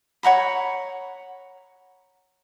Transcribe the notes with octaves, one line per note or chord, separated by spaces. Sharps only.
C#5 F#5 A#5 B5